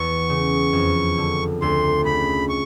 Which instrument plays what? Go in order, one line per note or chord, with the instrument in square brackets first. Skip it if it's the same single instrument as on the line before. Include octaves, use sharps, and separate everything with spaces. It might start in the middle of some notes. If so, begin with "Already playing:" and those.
Already playing: [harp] E2 [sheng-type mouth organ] C#6
[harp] C#3
F2
D3
[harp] D2 [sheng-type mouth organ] C6
[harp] C#3 [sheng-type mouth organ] B5
[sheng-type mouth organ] C#6